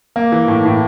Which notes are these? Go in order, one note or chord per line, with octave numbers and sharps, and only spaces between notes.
A#3
E3
A2
A2